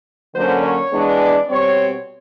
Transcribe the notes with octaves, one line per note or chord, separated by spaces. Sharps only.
D3 F#3 A#3 C#4 C5
C#5
E3 G#3 B3 D4
D5
B2 G3 C4 C#5